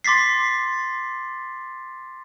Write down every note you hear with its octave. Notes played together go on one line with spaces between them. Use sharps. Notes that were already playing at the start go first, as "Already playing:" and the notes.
C6 D6 A6 B6 C7